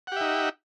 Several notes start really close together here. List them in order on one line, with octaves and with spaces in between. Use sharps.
F#5 G4 E5 D#4